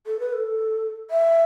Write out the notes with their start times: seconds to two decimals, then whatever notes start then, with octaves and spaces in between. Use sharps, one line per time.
0.06 A4
0.19 B4
0.33 A4
1.10 E5